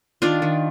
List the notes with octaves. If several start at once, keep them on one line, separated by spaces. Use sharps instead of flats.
D#3 D4 F4
D#3